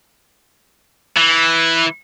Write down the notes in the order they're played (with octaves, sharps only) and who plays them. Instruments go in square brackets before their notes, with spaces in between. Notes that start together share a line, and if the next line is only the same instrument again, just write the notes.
[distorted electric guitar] E3